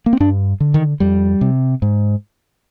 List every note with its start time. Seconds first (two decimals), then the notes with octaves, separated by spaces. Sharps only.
0.06 A#3
0.13 C4
0.20 G2 D4
0.60 D3
0.74 D#3
1.00 F2 G3
1.41 C3
1.82 G#2